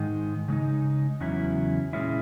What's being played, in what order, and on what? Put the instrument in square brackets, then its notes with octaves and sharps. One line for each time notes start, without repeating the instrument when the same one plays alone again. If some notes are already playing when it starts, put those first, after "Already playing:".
Already playing: [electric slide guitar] G#2 D#3 G#3 D#4
C#3 G#3 D#4
E2 C#3 F#3 C#4 E4
A#2 G#3 C#4 E4